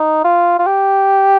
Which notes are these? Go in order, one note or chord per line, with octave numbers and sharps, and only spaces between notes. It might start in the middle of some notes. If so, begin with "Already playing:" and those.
Already playing: D#4
F4
F4
G4